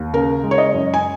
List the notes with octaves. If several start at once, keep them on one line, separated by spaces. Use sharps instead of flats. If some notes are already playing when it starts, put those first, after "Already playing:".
Already playing: D#2
C#3 A#4
G#3
C#5
D#5
F#2
G#5